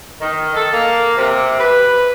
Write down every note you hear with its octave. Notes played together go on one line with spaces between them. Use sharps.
D#3
A4
A#3
C3
B4